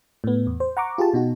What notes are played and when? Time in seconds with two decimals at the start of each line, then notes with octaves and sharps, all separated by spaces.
0.24 A2 B3
0.47 E2
0.60 C5
0.77 F#5 A#5 C#6 D6
0.98 F4 G4 G#4 A5
1.14 B2 D#4 F#4